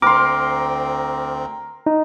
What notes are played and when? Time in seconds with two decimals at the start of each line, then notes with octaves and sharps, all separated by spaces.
0.02 D2 C4 A#4 C6 D6
1.86 D#4